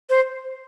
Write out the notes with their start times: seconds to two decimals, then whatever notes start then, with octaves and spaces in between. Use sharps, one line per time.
0.10 C5